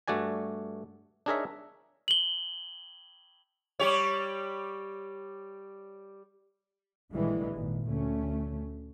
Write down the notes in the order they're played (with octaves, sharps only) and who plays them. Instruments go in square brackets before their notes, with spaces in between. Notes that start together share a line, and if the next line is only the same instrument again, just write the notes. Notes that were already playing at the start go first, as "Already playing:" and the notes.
[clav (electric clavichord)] G2 A3 F#4 D5 G#5
D4 D#4 G#4 A#4 C#5 E5
[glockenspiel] F#7 G7
[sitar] G3 G4 C#5
[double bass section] A#1 A#2 D3 E3 G3 G#3
G#1 A#2
D2 A3 C#4